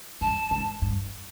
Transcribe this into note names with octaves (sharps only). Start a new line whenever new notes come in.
G2 A5
G#2
G2